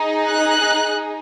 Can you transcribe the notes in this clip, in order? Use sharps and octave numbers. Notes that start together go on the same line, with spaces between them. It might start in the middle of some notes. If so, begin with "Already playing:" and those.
Already playing: D#4 G#4
F#6